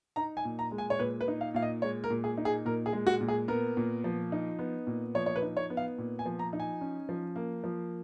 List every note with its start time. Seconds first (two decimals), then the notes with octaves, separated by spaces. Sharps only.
0.16 D#4 A#5
0.37 G#5
0.45 A#2
0.59 A#5
0.71 G#3
0.78 G#5
0.90 C#5
0.99 A#2 B4
1.21 B4
1.28 D#4
1.41 F5
1.54 A#2 F5
1.62 D#5
1.82 G#3 C#5
2.04 A#4
2.10 A#2
2.24 G#4
2.37 D#4
2.45 G#4
2.65 A#2 A#4
2.86 G#4
2.93 G#3
3.07 F#4
3.21 A#2
3.28 G#4
3.48 B3 A#4
3.77 A#2
4.04 F3
4.32 D#4
4.59 B3
4.87 A#2
5.15 F3 C#5
5.26 C#5
5.36 B4
5.42 D#4
5.57 C#5
5.70 B3
5.77 F5
5.98 A#2
6.19 G#5
6.26 F3
6.39 A#5
6.53 D#4
6.60 G#5
6.81 C#4
7.09 F3
7.36 A#3
7.64 F3